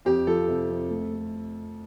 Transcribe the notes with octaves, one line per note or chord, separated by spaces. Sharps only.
F2 G4
F3 A4
C3
F2
A3
A3